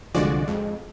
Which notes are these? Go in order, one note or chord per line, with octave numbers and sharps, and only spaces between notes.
C2 D3 F3 G#3 F#4 D5
F2 G#3